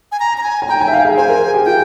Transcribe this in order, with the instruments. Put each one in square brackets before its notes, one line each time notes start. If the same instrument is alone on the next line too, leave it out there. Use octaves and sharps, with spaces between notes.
[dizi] G#5
A#5
A#5
G#5
[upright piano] G#5
[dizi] G5 [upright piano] A#5
[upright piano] G#5
E5
F5
G#4
[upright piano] C5 [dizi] G#5
[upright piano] A#4
G#4
G4
[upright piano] F4 [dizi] G5